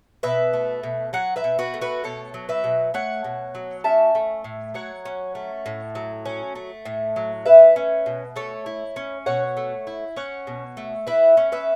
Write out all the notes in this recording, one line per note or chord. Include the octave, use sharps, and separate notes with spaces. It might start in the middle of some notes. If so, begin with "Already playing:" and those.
B2 B4 E5
A3
B2
F#3 C#5 F#5
B4 E5
B2
F#4 B4
A3
F#4 B4
B2 A4 C#5
F#3
B4 E5
B2
A3 C#5 F#5
B2
F#3
C#4 E5 A5
A3
A2
F#3 C#5 F#5
C#4
A3
A2
F#3
C#4
A3
A2
F#3
E4 B4 E5
C#4
B2
A3 A4 C#5
E4
C#4
B2 C#5 F#5
A3
E4
C#4 C#5 F#5
B2
A3
E4 B4 E5
C#4
B4 E5